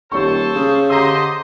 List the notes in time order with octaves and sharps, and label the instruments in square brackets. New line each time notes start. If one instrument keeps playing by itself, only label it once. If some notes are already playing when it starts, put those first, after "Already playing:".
[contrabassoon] D#1 [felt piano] G4 C#5 C#6 [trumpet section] A4 C5
[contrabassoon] C#3
[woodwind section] D3 G4 C6 [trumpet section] C5 D#5 [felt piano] A#5 E6